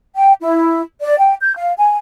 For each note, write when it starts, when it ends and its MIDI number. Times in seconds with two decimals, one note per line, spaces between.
0.16 0.32 79
0.41 0.81 64
1.02 1.16 74
1.19 1.35 79
1.41 1.53 91
1.56 1.72 77
1.78 1.96 80